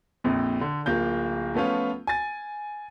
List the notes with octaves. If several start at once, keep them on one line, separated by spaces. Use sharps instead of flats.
A#1 F2 A#2
D3
D1 A#3 F4 G6
F3 A3 B3 C#4 F4
G#5 A6